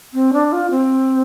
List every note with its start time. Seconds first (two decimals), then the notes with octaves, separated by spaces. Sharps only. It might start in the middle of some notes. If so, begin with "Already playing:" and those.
0.14 C4
0.33 D4
0.52 F4
0.71 C4